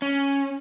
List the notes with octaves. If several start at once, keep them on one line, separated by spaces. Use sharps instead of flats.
C#4